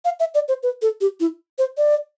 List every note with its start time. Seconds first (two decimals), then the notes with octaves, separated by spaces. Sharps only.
0.05 F5
0.20 E5
0.35 D5
0.48 C5
0.63 B4
0.82 A4
1.01 G4
1.20 E4
1.58 C5
1.77 D5